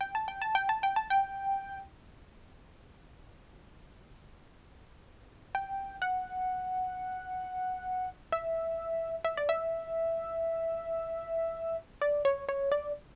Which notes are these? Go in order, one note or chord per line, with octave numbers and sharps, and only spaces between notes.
G5
A5
G5
A5
G5
A5
G5
A5
G5
G5
F#5
E5
E5
D5
E5
D5
C#5
C#5
D5